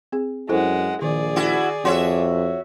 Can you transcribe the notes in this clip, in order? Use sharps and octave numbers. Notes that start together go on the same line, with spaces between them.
C4 G#4
F#2 G#3 E4 A4 C5 F#5
A#1 D#3 G#4 D5
E4 F#4
F2 F#4 C#5 E5 C6